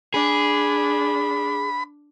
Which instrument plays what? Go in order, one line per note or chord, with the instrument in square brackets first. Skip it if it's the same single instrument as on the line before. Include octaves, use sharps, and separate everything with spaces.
[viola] D4 [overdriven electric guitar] G#4 [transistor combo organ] B5